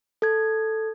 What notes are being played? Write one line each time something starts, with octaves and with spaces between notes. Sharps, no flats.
A4 G#6